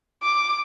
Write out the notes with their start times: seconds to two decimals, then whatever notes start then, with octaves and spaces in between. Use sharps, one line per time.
0.23 D6